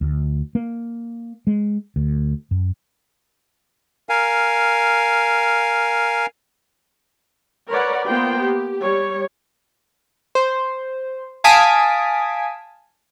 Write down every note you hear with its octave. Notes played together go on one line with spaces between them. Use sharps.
D2
A#3
G#3
D2
F#2
A#4 F5 G#5
A#4 B4 C#5 D5 F#5
A#3 B3 F4 C5 G5
G4
G3 C#5
C5
F5 G#5 A5 D#6 B6 D7